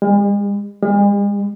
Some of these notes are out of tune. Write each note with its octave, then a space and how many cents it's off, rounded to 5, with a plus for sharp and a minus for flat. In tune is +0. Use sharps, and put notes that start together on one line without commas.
G#3 -45
G#3 -45